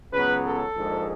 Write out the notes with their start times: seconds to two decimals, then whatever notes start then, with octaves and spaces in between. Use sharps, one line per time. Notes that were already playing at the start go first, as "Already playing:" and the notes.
0.12 C#2 C#3 F#3 B3 B4
0.44 A4
0.76 A#1 G#2 F3 G#3